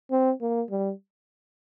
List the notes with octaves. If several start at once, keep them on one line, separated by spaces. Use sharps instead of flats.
C4
A#3
G3